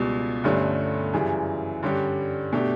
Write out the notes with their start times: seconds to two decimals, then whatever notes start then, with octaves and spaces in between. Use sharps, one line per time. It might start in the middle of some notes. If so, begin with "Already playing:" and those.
Already playing: C#2 B2 G3
0.44 G1 G2 D3 A3 C#4
1.14 F#2 C#3 E3 G3
1.83 G2 D3 G3 C#4 G4
2.53 B2 A3 D4 G4